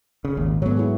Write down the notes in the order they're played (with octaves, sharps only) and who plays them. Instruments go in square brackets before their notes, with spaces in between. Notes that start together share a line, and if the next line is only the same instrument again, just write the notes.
[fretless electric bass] C#3
G#1 D#2 A#2
[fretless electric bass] G#2 F#3 [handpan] B3 A4 C#5
[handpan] E4 G#4